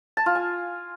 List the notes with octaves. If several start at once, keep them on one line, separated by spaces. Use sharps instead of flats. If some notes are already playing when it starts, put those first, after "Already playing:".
A5
F4
G#5